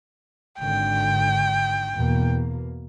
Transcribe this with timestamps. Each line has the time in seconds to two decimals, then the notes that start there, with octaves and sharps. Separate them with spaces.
0.59 G#1 D3 G5
1.95 E2 B2 A#3